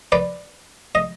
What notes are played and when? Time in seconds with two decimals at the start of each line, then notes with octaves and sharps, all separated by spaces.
0.12 B4 D5
0.95 D#5